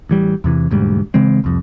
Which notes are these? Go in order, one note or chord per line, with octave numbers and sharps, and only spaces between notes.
A1 E3 G3
E2 C3 E3
E1 D2 G#2 G3
C#3 E3 G#3 C4
C2 F2